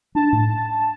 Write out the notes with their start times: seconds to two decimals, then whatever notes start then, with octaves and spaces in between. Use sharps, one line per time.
0.15 D4 A5
0.32 A2